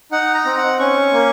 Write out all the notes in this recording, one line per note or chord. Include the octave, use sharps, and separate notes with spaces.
D#4 F#5
A#5
C4
F#5
C#4 C#6
A#3